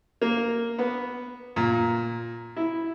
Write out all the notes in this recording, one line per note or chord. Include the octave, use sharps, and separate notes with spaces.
A#3
B3
A#2
E4